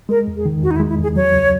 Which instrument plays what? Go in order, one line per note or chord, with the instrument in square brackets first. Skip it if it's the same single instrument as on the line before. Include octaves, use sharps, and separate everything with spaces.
[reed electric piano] G#3 [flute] A#4
[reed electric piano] E2
[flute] G#4
[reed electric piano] D#3
[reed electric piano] E2 [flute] F#4
[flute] D#4
E4
[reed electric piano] G#3
[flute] E4
[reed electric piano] E2 [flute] G#4
[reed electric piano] F#3 [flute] C#5
[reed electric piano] C#2